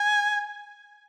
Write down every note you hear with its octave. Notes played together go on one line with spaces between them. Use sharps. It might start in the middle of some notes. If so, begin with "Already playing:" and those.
Already playing: G#5